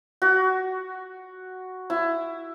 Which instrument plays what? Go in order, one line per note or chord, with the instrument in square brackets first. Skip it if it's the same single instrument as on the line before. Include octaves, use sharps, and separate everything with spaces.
[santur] F#4
E4